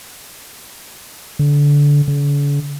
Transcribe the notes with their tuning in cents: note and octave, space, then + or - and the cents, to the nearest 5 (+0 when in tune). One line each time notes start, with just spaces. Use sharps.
D3 -20
D3 -45